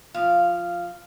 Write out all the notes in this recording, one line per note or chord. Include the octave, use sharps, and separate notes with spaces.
F3 F5